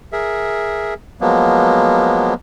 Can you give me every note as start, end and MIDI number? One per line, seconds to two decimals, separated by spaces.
0.12 0.94 68
0.12 0.94 70
0.12 0.94 76
1.21 2.34 53
1.21 2.34 54
1.21 2.34 56
1.21 2.34 58
1.21 2.34 59